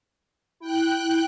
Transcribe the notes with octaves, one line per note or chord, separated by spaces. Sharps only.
E4 G5 F#6